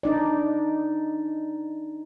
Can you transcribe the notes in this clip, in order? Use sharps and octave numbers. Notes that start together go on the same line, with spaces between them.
D4 D#4 D5